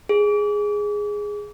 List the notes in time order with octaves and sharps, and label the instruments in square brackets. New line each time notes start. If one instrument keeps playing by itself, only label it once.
[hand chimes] G#4